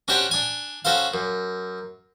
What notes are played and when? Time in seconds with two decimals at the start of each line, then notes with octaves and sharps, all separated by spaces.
0.08 C#4 D4 F#4 G4 C5 G5
0.31 D4 G#5
0.85 C#4 F#4 A4 C5 F5
1.14 F#2